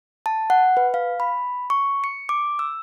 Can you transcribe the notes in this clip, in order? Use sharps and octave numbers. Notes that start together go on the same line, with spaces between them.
A5
F#5
B4
F5
B5
C#6
C#7
D6
E6